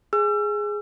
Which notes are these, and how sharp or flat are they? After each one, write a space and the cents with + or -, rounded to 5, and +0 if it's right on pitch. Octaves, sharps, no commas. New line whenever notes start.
G#4 +0 E6 +40